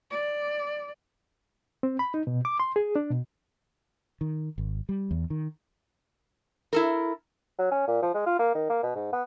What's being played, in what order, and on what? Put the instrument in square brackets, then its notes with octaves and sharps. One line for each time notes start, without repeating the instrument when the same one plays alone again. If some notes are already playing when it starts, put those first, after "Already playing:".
[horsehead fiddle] D5
[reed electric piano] C4
B5
D#4
B2
D6
C6
G#4
D4
B2
[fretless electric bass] D#3
G#1
G3
E2
D#3
[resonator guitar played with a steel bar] E4 A4 A#4
[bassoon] F#3
C#4
A#2
F3
G#3
F4
A#3
D#3
A#3
B2
G#2
B3